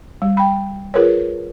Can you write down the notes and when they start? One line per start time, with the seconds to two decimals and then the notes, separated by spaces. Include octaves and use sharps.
0.22 G3
0.37 G5 B5
0.94 F4 G#4 A#4 B4 C#5